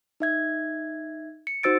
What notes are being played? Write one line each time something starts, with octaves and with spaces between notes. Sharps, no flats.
D#4 E5 G#6
C#7
D#4 F#4 C5 E6 A6 D7